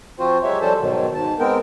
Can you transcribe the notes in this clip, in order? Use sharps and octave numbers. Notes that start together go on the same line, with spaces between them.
F3 C4 F4 F#4 C5
F#3 G#3 G4 C#5 E5
F3 G3 C#4 A4 C5 A5
G#2 B2 D#3 F#3
G#2 A5
G#3 B3 C4 A#4 G5